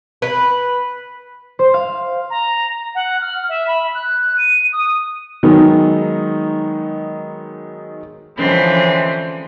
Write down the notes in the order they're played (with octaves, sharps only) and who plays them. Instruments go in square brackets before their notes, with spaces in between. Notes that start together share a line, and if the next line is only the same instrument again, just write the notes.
[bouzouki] B4
[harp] C5
F5
[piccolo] A#5
F#5
F6
E5
B5
F#6
D#7
D#6
[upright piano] D#3 F#3 G#3 B3 D#4
[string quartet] D3 E3 F3 G#3 C4 C#4